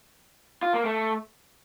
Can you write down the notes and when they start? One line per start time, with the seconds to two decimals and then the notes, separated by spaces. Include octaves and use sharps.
0.63 F4
0.74 A#3
0.85 A3